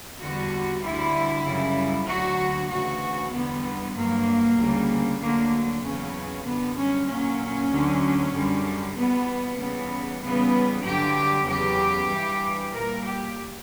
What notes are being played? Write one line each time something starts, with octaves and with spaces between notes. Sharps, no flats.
E2 D3 G3 F#4
D2 D3 G3 E4
F#2 C#3 G3
D2 D3 F#3 F#4
D2 C#3 E3 F#4
E2 D3 G3 B3
G2 F#3 A#3
D2 C#3 G3
D2 D3 F#3 A#3
E2 C#3 F#3 C#4
F#2 D3 G3 B3
C#4
A#2 F#3 C#4
D2 D3 F#3
F#2 D3 G3
E2 B2 G3 B3
E2 C#3 E3 G3 B3
E2 C#3 E3 G3 B3
G2 D3 F#3 G4
E2 C#3 F#3 G4
G2 E3 G3
A#2 G3 A#4
G4